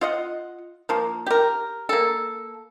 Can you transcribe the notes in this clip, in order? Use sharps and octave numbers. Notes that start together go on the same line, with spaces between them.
F4 D#5 F#5
F3 A#3
G4 A#4
A#3 A4